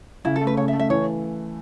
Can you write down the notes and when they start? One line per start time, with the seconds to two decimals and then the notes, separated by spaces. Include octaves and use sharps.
0.25 C#3 E4
0.36 A4
0.41 A3
0.47 B4
0.57 C#3 C#5
0.68 E5
0.73 A3
0.80 E5
0.89 E3 C#5